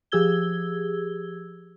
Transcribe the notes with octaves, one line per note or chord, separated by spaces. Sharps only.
F3 G4 G#4 E6 G#6 G7